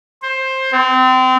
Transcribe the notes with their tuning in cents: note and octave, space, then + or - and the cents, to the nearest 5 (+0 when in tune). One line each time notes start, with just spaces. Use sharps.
C5 +15
C4 -30